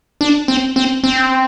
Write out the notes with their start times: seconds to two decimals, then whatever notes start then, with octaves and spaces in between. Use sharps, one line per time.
0.21 D4
0.48 C4
0.76 C4
1.04 C4